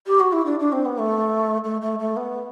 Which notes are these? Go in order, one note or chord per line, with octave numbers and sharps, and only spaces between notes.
G4
F#4
E4
D4
D4
C4
B3
A3
A3
A3
A3
B3